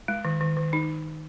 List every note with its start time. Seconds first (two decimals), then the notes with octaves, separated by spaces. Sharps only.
0.08 G#3
0.25 D#3
0.41 D#3
0.57 D#3
0.73 D#4